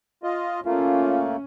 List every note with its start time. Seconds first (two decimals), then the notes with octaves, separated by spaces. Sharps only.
0.23 F4 D#5
0.66 A3 A#3 C#4 F4